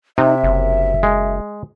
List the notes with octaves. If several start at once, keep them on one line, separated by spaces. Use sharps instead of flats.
C3 D#4 E5
F#1
G#3